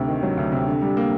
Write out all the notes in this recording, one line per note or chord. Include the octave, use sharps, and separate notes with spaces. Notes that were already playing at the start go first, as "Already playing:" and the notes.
Already playing: D2 C3
D#3
F#3
D2
C3
D3
G3
A#3